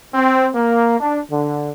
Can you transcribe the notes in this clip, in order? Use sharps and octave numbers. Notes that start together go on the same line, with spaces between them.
C4
A#3
D4
D3